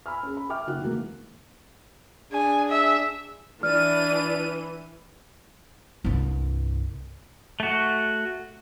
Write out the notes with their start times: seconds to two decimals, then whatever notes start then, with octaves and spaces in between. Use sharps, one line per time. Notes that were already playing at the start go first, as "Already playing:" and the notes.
0.06 G#5 B5 E6 F6
0.23 C#4 G#4
0.37 B5
0.49 E5 G5 D6 F6
0.67 F#1 D#4 F#4 F#6
0.81 C3 E3 G#3 A#3
2.32 D4 G#4 G#5
2.70 E5
3.63 E3 D4 D5 F6 D#7
6.04 C2 G2
7.60 A3 F#4